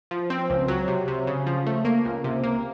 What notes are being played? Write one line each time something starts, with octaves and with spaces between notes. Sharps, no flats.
F3
C4
C#2
F#3
C3
C3
C#3
F3
A3
A#3
C#2
C3
A#3